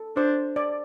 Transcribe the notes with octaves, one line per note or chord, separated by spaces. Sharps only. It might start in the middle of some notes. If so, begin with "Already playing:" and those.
Already playing: A4
D4 C5
D5